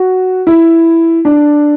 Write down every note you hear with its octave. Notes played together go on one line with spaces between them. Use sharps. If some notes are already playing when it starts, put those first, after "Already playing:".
Already playing: F#4
E4
D4